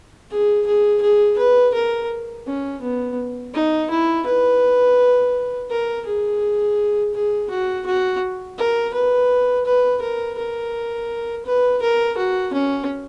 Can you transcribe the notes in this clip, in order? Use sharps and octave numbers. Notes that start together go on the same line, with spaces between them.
G#4
G#4
G#4
B4
A#4
C#4
B3
D#4
E4
B4
A#4
G#4
G#4
F#4
F#4
A#4
B4
B4
A#4
A#4
B4
A#4
F#4
C#4